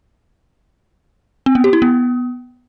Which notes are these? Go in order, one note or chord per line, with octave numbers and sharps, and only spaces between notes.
C4
B3
G4
E4
B3